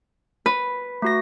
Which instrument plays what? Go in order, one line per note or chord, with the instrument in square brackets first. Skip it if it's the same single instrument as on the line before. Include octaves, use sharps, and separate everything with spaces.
[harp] B4
[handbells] A3 F#4 A#6